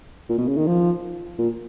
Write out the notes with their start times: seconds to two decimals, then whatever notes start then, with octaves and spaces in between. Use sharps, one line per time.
0.29 A#2
0.38 B2
0.48 C#3
0.57 D#3
0.66 F3
1.38 A#2